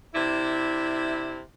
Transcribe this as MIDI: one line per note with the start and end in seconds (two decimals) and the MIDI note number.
0.15 1.39 48
0.15 1.39 62
0.15 1.39 64